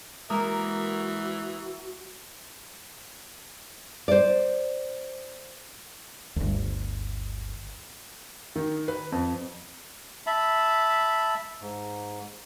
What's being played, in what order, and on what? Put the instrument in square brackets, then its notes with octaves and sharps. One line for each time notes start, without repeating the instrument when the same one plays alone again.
[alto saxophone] E3 [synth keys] G#3 D#6 [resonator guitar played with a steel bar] A#3 A#4 [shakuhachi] F#4
[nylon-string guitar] C5 D5
[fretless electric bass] G1 D2
[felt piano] D#3
B4
F2
[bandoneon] E5 A5 B5
G#2